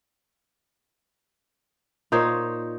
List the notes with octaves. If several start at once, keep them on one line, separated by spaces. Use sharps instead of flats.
A#2 D#4 C5 C#5